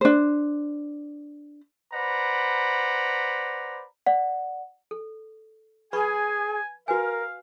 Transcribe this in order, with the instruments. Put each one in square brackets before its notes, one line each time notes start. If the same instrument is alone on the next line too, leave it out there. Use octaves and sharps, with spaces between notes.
[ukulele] D4 C5
[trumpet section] B4 C5 D5 F#5 A#5 B5
[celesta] D5 F#5
[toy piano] A4
[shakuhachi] G#4 [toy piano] B4 B5 C#6 [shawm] G#5
[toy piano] F#4 B4 G#5 [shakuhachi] A#4 [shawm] F5